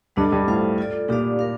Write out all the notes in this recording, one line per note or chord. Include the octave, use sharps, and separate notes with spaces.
G2 G3 D4 A4 D#5
G2
A2 F4 A4 C5 F5
F4 A4 D5
A#2 D#4 G4 D5 F5
A#4 F5